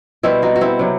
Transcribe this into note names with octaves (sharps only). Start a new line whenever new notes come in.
B2 G3 C4 E4
D#4 F#4
F#4
C4 E4
C3 F#3